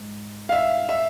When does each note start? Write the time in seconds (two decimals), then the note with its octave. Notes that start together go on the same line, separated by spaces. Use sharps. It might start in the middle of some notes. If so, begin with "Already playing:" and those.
Already playing: G#2
0.49 F5
0.52 E5
0.89 E5